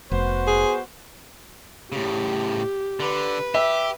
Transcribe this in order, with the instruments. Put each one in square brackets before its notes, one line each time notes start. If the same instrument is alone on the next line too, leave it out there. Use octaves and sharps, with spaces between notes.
[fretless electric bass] F1 [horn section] B3 F#4 C5
[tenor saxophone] G#4
[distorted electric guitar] A2 C#3 [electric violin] G4
[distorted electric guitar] D3 [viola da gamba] B4
[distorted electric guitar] G4 [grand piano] E5